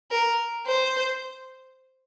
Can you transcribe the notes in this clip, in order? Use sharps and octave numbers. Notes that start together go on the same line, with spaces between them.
A#4
C5